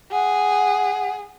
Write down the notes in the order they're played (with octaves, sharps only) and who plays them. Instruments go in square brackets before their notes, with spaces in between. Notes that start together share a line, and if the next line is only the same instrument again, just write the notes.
[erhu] G#4 [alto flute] F#5